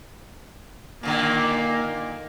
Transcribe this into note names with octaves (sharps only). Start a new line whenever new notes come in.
A#2 D3 D#3 A#3